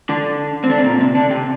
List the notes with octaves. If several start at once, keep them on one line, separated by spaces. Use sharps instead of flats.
D3 D4
C4
D3 D4
C4
A#2 A#3
C3 C4
D3 D4
C3 C4